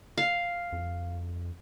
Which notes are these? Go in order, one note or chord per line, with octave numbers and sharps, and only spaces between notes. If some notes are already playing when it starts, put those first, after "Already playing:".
F5
F2